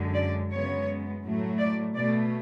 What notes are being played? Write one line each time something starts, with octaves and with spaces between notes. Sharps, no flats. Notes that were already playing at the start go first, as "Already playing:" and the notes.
Already playing: F#2 D3 G#3
D5
F#2 C#3 G#3 B3 C#5
A2 F#3 A3
D5
B2 A3 D5